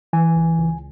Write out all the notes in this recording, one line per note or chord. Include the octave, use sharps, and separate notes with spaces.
E3 G#5
C#2
C#2